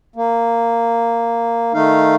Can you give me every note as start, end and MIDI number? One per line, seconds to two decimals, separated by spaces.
0.16 1.73 58
1.74 2.15 51
1.74 2.15 57
1.74 2.15 63
1.74 2.15 77